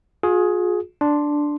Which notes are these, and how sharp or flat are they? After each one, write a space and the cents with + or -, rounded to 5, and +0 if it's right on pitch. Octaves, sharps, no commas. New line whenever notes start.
F4 +45 G#4 +10
D4 +0 C6 +0